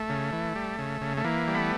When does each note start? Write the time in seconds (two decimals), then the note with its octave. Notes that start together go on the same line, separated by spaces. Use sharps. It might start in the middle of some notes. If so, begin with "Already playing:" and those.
Already playing: A3
0.10 C#3
0.33 E3
0.55 G3
0.79 C#3
1.01 C#3
1.17 A3
1.24 E3 A#3
1.48 G3
1.55 A3 B3